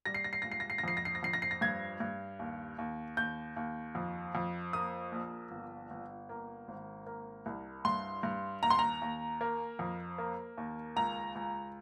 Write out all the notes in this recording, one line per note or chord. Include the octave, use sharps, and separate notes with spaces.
G3 A#6
C7
A#6
C7
C#2 A#6
C7
A#6
C7
A#6
F2 C7
A#6
C7
A#6
F2 C7
A#6
C7
A#6
G2 G#6
G2
D#2
D#2
D#2 G6
D#2
F2
F2
A#3 D#6
A#1
G1
G1
A#3
G#1
A#3
C2
G2 C6
G2
D#2 A#5
C6
A#5
D#2
A#3
F2
A#3
D#2
C#2 A#5
C#2